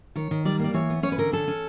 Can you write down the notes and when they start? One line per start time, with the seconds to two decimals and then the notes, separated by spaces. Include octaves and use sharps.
0.16 D#3 C#5
0.31 D#3
0.45 G3 D5
0.59 A#3 D5
0.74 E3 C#5
0.90 B3
1.03 C#4 C#5
1.12 B4
1.18 D3 A#4
1.32 C#4 A4
1.47 C#4